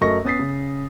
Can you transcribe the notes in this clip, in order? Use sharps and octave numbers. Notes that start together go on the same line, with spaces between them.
F#2 A3 A#4 D#5 C#6 A#6
B3 C#4 D#6 A6 B6 C7
C#3